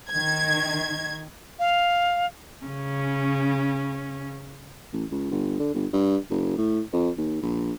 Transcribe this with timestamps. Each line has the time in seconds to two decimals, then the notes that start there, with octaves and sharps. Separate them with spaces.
0.10 D#3 G#6
1.59 F5
2.64 C#3 C#4
4.93 A1
5.11 C#2
5.31 G1
5.59 D3
5.74 G1
5.93 G2
6.31 F#1
6.58 A2
6.93 F2
7.18 D#2
7.42 A#1